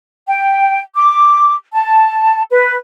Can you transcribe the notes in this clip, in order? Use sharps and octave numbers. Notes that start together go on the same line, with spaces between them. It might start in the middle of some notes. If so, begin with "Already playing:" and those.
G5
D6
A5
B4